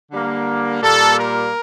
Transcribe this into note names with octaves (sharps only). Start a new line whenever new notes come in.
D3 G3 A#3
A#2 G3 A#3 A4
A#4